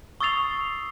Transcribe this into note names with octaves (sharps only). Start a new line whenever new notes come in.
C#6 D#6 E6 A6 C7 F7